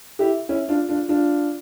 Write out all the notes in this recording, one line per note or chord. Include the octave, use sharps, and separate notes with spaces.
E4 G4
C#4 E4
D4 F4
D4 F4
D4 F4